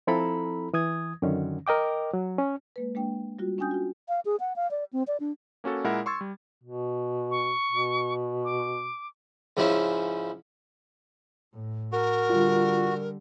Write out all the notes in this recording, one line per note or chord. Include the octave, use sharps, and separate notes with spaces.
F3 C4 E4 A4 A#5 B5
E3 D#6 G#6
F#2 D3 D#3 C#4
A#4 D#5 G5 D6
F#3
C#4
G#3 A#3 B4
G#3 A#3 D4 G5
G3 F4 F#4
C#4 D4 G5 G#5 D#6 G6
F4 F#4
F5
G#4
F#5
F5
D5
C4
D5
D4
A#3 C#4 F#4 A4
A#2 G#3 E4 A#4 E5 F#5
C6 C#6 E6 G#6 A6
G3
B2
C#6
B2
D6
G#2 C#3 F3 C#4 E4
A2
F#4 A#4
D3 G3 F4